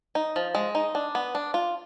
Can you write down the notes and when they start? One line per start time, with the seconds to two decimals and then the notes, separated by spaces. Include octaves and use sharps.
0.15 D#4
0.36 F3
0.55 G#3
0.75 D#4
0.95 D4
1.15 B3
1.35 D4
1.54 F4